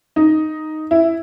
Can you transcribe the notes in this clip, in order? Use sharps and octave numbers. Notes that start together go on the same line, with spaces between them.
D#4
E4